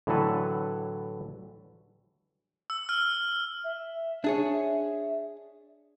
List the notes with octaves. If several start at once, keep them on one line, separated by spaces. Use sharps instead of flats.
A2 D3 E3 F#3 A4 B4
E6
F6
E5
D4 G#4 C#5